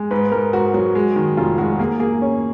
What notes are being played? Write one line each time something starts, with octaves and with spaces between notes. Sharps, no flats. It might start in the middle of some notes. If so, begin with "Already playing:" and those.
Already playing: G#3
G#2 B4
G#2 A#4
G#2 F#4
F#3 F#4
G#3
D#3
F1 F4
G#3 F#4
A#3 G#4
A#3 G#4
C#4 C#5